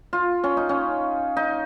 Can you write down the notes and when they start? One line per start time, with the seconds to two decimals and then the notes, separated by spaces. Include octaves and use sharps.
0.13 F4
0.44 C#4
0.57 D#4
0.69 C#4
1.37 D#4